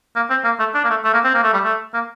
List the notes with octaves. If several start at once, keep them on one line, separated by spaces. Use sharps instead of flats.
A#3
C4
A#3
A3
D4
A#3
A3
A3
A#3
C4
A#3
A3
G3
A3
A#3